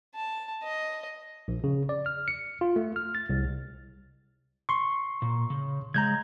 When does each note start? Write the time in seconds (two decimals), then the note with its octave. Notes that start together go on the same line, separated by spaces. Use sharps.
0.15 A5
0.63 D#5
1.48 A#1
1.64 C#3
1.89 D5
2.06 F6
2.28 C#7
2.61 F4
2.76 A3
2.96 F6
3.15 A6
3.29 C2
4.69 C6 C#6
5.22 A#2
5.50 C#3
5.94 C#3 G#3 A#5 G6 G#6